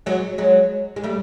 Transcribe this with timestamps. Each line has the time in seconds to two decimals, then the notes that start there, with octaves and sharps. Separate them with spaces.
0.06 F#3 G#3
0.38 F#3 G#3
0.96 G#3
1.04 G3 A3